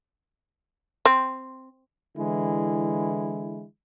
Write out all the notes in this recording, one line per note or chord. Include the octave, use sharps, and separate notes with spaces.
C4
D3 E3 G#3 E4